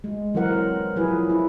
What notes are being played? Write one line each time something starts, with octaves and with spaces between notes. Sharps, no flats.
G#3
E3 F#3 C4 A#4 F#5
F3 F#3 E4 G#4 B4
E4